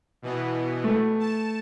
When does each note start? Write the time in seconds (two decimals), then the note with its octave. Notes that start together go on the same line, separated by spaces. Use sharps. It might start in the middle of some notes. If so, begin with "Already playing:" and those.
0.22 B2 E3 B3
0.84 A3
1.20 A5